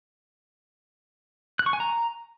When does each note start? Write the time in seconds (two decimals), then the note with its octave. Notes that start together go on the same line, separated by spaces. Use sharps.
1.59 F#6
1.66 C#6
1.73 G#5
1.80 A#5